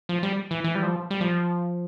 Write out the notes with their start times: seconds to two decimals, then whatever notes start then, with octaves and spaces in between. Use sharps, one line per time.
0.09 F3
0.23 G3
0.51 E3
0.64 E3
0.75 G3
0.83 F3
1.11 G3
1.21 F3